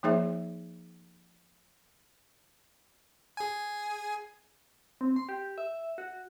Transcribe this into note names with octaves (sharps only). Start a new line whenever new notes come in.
F3 A#3 D#4 G#4 C5 E5
G#4 G#5
C4
C6
G4
E5
F#4